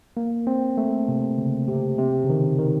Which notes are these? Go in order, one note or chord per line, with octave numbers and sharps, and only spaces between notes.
A#3
C4
A3
C3
C#3
C3
C3
C#3
D#3
D#3